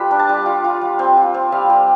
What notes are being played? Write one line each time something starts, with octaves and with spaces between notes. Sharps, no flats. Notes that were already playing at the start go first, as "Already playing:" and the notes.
Already playing: G3 F4 G4 A4 B4 B5
D4
A5
G3
F4
F4
G3
C4
F4
C4
G3 F5
G3